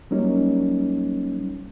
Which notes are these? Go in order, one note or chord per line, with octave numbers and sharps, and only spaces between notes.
F#3 G3 A#3 C#4 D#4